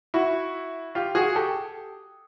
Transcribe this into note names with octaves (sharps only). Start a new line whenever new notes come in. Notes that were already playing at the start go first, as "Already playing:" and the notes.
E4 F#4
F4 G4
F#4 G#4
G4 A4